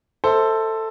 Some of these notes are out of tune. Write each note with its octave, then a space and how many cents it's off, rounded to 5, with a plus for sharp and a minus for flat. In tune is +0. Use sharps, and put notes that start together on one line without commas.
A4 +10 C5 +0 E5 -30